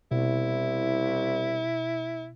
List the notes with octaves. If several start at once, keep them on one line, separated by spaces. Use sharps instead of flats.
C2 B2 E4